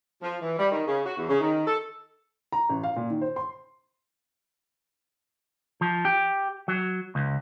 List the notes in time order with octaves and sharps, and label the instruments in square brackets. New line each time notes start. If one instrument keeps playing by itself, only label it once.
[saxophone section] F3
E3
G3
D#3
C#3
F#4
E2
C#3
D#3
A4
[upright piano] A#5
A1
F5
A#2
D#3
C5
C6
[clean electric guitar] F3
G4
F#3
C#2